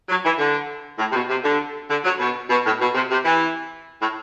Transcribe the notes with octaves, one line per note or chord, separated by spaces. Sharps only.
F#3
E3
D3
A2
C3
B2
C3
D3
D3
F#3
B2
B2
A2
B2
C3
C3
E3
A2